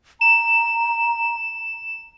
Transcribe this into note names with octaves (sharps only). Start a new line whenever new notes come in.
A#5 E7